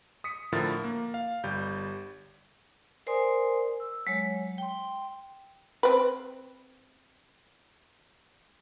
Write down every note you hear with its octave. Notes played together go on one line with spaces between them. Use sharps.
D#6 B6 C#7
A2 D3 F3 E4 A#4 A6
A#3
F5
G1 G3 G6
A#4 C5 D5 G#5 C6 D#6
E6
F#3 G#3 C#5
G5 C6
C4 B4